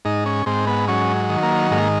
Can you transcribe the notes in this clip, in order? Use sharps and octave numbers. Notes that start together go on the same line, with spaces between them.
G#2 D#4
C#4
G#2 C4
B3
F#3 C#4
D#3
A#3
G#2 A#3